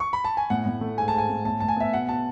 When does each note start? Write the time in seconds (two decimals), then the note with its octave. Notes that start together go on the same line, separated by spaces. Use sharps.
0.00 C#6
0.13 B5
0.25 A5
0.37 G#5
0.50 A2 F#5
0.66 A2
0.81 A3
0.98 G#2 G#5
1.08 A5
1.13 G#2
1.18 G#5
1.30 A3
1.45 A2 A5
1.60 A2 A5
1.68 G#5
1.76 B3 E5
1.93 B2 F#5
2.08 B2 A5